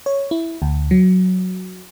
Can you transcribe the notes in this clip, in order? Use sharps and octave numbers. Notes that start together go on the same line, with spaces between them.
C#5
E4
D2
F#3